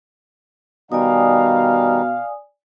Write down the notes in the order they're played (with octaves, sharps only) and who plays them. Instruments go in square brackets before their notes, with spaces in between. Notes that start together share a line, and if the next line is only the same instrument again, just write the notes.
[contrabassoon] B2 [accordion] D#3 G3 D#4 [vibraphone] D5 G#5 D#6 [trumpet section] F5